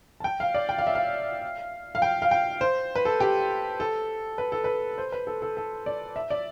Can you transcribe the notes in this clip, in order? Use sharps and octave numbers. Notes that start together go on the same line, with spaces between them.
A5
G5
F5
D5
G5
F5
E5
F5
F5
G5
F5
G5
C5
B4
A4
G4
A4
B4
A4
B4
C5
B4
A4
A4
A4
D5
E5
D5